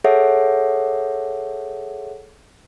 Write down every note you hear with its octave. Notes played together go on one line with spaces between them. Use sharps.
G#4 A4 C#5 E5 F#5